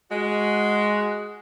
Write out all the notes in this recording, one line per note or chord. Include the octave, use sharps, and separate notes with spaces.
G#3 F#4